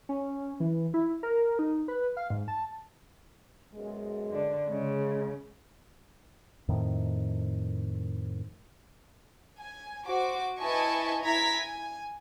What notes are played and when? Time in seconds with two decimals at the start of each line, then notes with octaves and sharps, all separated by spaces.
0.09 C#4
0.60 E3
0.94 E4
1.23 A#4
1.59 D#4
1.88 B4
2.17 F5
2.30 G#2
2.48 A5
3.74 F#2 B2 G#3
4.31 D3 D4
4.69 C#3 G#3
6.68 F2 A2 D#3
9.60 G#5
10.07 F#4 C5 D6
10.61 E4 B4 D#5 G#5 A5 C#6
11.23 E4 A#5 G#6 A#6 B6
11.56 G#5